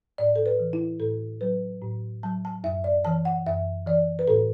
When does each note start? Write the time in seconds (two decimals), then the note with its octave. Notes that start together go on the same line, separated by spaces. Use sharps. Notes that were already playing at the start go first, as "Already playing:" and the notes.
0.18 A2 D5
0.36 A4
0.46 B4
0.60 E3
0.73 E4
1.00 A2 A4
1.41 F#3 B4
1.82 A2
2.23 F#3 A5
2.45 A5
2.64 F#2 E5
2.84 D5
3.05 E3 A5
3.25 F#5
3.47 F#2 E5
3.86 E3 D5
4.19 B4
4.28 A2 A4